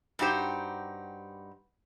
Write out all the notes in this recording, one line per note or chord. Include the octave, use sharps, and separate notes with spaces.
G2 D#4 F#4 G4 C5